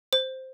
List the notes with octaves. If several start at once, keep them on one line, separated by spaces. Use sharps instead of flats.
C5